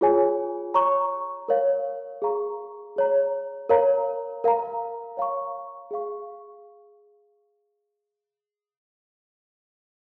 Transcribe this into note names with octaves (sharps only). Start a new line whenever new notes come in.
F4 G#4 C#5 G#5
C#5 A#5 C#6
A#4 C#5 F5
G#4 F5 A#5 C#6
G#4 C#5 A#5
A#4 C#5 F5 A#5
A#4 F5 A#5
C#5 F5 A#5 C#6
G#4 F5 C#6